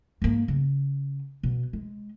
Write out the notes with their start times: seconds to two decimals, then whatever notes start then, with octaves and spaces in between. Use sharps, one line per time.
0.22 G#2 A#3
0.48 C#3
1.43 B2
1.73 G#3